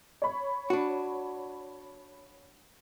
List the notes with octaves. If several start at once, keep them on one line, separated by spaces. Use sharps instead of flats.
C#5 B5
D4 F#4